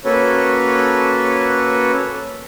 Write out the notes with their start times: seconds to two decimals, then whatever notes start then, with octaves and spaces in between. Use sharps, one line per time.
0.05 A#3 C#4 F#4 A4 B4 C#5